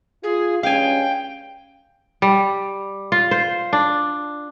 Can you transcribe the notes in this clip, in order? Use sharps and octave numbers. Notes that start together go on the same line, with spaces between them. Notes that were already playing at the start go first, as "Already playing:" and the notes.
F4 G#4
G2 G#3 C#4 F5 G5 G#5
G3
F4
C5
D4